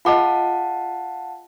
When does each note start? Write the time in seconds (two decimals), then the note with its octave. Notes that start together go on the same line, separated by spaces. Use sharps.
0.05 F4 G#4 D#5 F5 F#5 A5